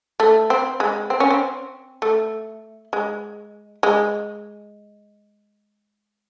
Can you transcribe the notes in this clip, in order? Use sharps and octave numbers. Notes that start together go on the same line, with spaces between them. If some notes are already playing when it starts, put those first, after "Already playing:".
A3
C4
G#3
C4
C#4
C4
A3
G#3
G#3